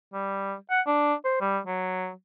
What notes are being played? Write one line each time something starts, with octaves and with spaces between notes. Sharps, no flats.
G3
F#5
D4
C5
G3
F#3